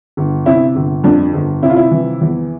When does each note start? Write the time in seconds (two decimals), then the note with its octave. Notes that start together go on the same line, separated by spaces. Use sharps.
0.17 G1
0.46 C3 E4
0.75 G1
1.04 F2 D4
1.33 G1
1.63 C3 E4
1.70 F4
1.76 E4
1.91 E3
2.21 E2